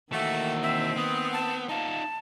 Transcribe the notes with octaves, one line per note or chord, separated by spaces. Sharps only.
D#3 E3 A3 A#3 F#4
C4 E5
B3 D#6
A5
D#4 F4 A5